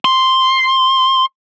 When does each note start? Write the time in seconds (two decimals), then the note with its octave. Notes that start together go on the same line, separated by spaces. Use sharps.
0.05 C6